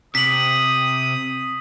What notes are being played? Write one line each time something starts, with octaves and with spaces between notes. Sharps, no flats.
C3 D#6 B6 F#7